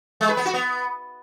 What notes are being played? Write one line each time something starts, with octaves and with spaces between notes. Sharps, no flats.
G#3
B4
B3
F#4
B3